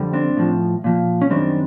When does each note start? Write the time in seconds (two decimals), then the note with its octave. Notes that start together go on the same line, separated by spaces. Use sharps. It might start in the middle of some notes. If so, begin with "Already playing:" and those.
Already playing: F2 D3 G3
0.13 C4 D4
0.37 A2 F3
0.84 A#2 F3
1.22 C#4
1.30 F#2 D#3 G3 C4 D4